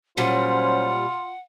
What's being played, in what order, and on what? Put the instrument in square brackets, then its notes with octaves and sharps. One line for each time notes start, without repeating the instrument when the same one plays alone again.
[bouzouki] A#2 G3 [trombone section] F#3 C#4 C5 [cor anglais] F4 [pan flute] F#5